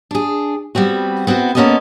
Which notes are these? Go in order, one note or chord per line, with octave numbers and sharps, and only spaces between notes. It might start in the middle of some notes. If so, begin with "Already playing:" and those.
D4 G#4
G3 B3 C4 F#4
B3 C4 E4 F#4
A#3 B3 C#4 A4 C#5 D#5